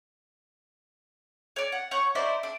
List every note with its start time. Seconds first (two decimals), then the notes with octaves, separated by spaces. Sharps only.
1.56 C#5 D5
1.72 F#5
1.91 C#5 F#5 C#6 G6
2.15 D#4 E4 C5 D5
2.43 D4